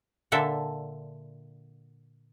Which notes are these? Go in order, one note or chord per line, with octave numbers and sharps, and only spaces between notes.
A#2 D3 A4 E5